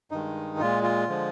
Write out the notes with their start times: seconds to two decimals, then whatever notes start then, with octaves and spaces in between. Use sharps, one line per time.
0.11 G2 D#3 G#3 D#4
0.60 A#2 G#3 F4
0.83 F4
1.09 D3 F3 G#3